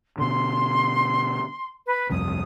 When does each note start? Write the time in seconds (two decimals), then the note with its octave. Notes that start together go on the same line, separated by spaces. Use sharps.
0.18 B2 D3 C6
1.86 B4
2.10 G1 C2 F2 D#6